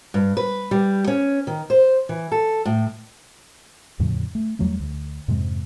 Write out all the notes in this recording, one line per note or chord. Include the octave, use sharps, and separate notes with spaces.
G2
B4
G3
C#4
D#3
C5
E3
A4
A2
E2 A2 C#3 F3
A3
E2 F#3 G3 A3
D2
F2 G#2 C3 G#3